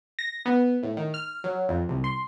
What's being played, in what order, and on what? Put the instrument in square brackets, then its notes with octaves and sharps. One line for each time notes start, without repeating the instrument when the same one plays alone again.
[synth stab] A#6
B3
A2
D#3
F6
F#3
F2
C2
C6